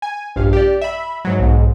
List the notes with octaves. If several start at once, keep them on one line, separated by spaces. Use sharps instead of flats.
G#5
A#1 G2 F5
G4 D5
E5 B5
G#2 F#3
B1 G#2